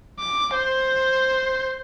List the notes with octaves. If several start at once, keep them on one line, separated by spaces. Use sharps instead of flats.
D6
C5